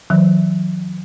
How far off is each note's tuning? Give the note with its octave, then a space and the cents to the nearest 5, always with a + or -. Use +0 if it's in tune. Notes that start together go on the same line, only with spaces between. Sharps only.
D#3 +30 F#3 -35